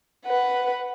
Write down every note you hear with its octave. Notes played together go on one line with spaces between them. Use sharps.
B4 F#5